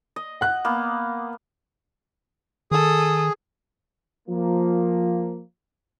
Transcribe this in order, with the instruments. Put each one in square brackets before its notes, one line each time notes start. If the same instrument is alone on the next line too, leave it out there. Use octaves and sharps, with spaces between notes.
[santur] D#5
[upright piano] F#5 F#6
[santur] A#3 B3
[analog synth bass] D#3 [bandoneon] G#4 [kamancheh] A4 D#6
[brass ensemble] F3 A#3